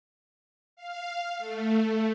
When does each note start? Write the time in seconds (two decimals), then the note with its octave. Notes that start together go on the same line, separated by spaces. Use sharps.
0.76 F5
1.38 A3